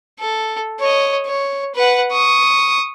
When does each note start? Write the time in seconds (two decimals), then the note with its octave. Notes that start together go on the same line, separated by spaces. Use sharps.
0.19 A4
0.80 C#5 D#5
1.26 C#5
1.75 B4 F#5
2.12 C#6 D#6